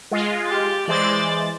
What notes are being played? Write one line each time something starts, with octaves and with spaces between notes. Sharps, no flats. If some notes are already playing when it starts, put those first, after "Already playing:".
G#3 F4
G4 A6
E3 G#3 C5 D5 A6